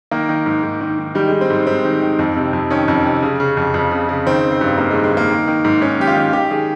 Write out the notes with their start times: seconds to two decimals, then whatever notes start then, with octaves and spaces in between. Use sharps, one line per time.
0.11 D#3 A#3
0.29 D#3
0.46 G#2
0.63 G#2
0.81 D#3
0.98 D#3
1.15 D#3 G3
1.28 G#3
1.32 D#3
1.41 C4
1.50 G#2
1.67 G#2 C4
1.85 D#3
2.02 D#3
2.19 F2
2.36 C3
2.53 F2
2.70 D#3 C#4
2.88 F2
3.05 C3
3.23 C#3
3.40 C#3
3.57 F2
3.74 F2
3.91 C#3
4.09 C#3
4.26 D#3 C4
4.43 D#3
4.52 C4
4.61 G2
4.77 G2 A#3
4.91 G#3
4.95 D#3
5.04 G#3
5.12 D#3 A#3
5.30 D#3
5.48 D#3
5.65 G#2
5.81 G#2 C#4
5.99 D#3 G4
6.07 F4
6.16 D#3
6.33 D#3 G4
6.50 D#3 G#4